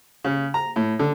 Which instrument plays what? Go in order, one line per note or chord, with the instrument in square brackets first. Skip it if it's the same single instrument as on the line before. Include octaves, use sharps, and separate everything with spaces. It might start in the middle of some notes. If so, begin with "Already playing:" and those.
[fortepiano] C#3
A#5
A2
D3